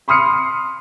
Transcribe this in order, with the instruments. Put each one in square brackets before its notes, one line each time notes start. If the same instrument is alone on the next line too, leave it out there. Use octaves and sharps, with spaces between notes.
[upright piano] B5 C6 D#6 F6 C7 C#7